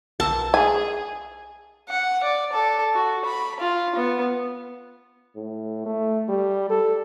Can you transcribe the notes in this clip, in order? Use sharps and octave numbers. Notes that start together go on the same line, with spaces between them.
B1 A#4 A5 E6
G#4 G#5
F#5
D5
A4
F#4
B5
F4
B3
A2
A3
G3
A4